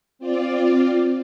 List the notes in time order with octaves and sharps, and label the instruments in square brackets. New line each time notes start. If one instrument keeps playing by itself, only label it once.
[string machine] C4 F4 D5